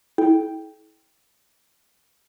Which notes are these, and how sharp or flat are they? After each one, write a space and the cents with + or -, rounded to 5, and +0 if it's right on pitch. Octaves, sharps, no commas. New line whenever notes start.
E4 -25 A4 -45 G5 +0